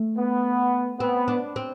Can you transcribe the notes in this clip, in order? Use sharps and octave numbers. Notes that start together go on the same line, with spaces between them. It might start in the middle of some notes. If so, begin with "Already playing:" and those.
Already playing: A3
B3
B3 C4
D4
C4